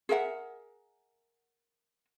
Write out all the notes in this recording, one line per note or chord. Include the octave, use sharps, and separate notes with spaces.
G#4 A#4 E5 F#5